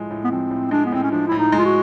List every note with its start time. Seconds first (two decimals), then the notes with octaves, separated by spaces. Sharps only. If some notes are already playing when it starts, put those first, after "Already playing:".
Already playing: A2 F3 G#3
0.11 A2
0.24 B3
0.31 F3 C4
0.51 A2
0.71 G#3 D4
0.86 B3
0.92 A2 C4
1.03 C#4
1.11 F3 D4
1.28 A2 E4
1.39 D#4
1.52 G#3
1.59 F4
1.65 F#4